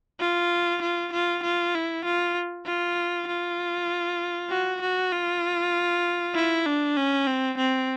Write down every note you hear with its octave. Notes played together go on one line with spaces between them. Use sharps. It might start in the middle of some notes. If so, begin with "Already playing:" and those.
F4
F4
F4
F4
E4
F4
F4
F4
F#4
F#4
F4
E4
D4
C#4
C4
C4